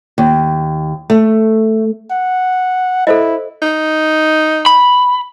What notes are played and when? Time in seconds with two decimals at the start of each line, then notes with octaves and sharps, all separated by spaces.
0.18 D#2
1.10 A3
2.11 F#5
3.07 E4 A4 C5 D#5
3.62 D#4
4.66 B5